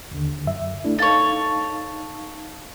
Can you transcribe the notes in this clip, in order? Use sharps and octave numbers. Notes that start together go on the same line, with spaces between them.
D#2 D3
F#2 E5
A3 D4 E4
D#4 A4 C#5 F5 A5